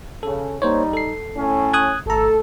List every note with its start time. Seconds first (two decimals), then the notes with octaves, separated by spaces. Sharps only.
0.23 C#3 A4
0.62 G3 A#3 D#4 C5 C#5
0.93 A4 C7
1.36 A2 C#4
1.73 D#6 F#6 G#6
2.06 G#1 A3 A4 A#5